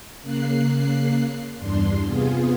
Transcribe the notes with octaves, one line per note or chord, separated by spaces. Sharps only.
C#3 A#3 F#6 C7
E2 G2 D4 C6
C3 B3 F4 G#4